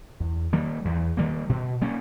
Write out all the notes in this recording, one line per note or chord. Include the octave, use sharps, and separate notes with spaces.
E2
D#3 G3 A#3
E2
D#3 G3 A#3
B2
G3 A#3 C#4